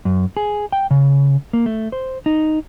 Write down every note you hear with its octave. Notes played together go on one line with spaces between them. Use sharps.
F#2
G#4
G5
C#3
A#3
A3
C5
D#4